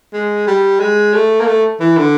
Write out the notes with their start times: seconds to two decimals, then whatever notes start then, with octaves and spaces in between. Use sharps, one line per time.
0.13 G#3
0.47 G3
0.80 G#3
1.14 A3
1.41 A#3
1.47 A3
1.80 E3
1.97 D3